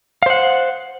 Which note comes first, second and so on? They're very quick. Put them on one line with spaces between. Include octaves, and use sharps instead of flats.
F5 C5 F#5